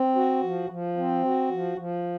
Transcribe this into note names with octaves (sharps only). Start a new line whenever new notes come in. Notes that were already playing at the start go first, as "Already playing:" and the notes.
Already playing: C4
F#4
F3
F3
C4
F#4
F3
F3